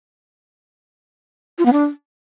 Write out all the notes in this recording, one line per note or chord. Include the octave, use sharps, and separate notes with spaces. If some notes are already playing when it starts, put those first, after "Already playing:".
F4
B3
D4